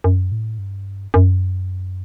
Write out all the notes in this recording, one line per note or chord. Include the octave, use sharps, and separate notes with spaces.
F#2
A2
G2
F#2